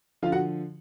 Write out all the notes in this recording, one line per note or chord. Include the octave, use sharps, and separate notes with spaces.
D3 F3 F4 F5
F#4 F#5